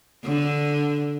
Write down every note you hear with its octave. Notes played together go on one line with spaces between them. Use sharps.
D3